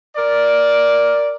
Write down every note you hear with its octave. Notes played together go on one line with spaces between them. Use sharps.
A#4 D5